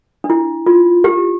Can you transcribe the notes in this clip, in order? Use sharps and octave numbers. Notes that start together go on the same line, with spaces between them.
D4
E4
F4
G4